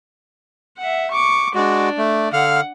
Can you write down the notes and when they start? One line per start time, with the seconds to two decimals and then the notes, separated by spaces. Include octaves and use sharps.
0.78 E5 F#5
1.11 C#6 D6
1.55 G#3 D4 F#4 D5
1.98 A3
2.33 D3 F5 F#5 F6